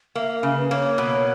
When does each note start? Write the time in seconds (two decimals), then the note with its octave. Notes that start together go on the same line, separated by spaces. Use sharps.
0.15 A#3 E5
0.37 E5
0.43 C#3 F5
0.57 B4
0.71 A#3 C#5
0.98 B2